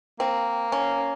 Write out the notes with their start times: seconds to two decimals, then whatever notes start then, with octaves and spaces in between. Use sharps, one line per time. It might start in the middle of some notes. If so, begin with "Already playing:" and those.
0.20 A#3 C4
0.72 C#4